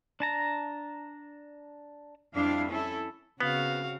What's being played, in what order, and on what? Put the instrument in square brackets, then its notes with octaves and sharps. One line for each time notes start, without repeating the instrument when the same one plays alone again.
[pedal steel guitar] D4 A5 A#5
[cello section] F2 G3 D4 E4 F5
C#4 E4 A4
[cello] C#3 C4 [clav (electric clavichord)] B3 [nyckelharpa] F#4 F5